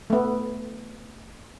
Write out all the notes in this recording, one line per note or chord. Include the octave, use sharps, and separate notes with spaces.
A3 B3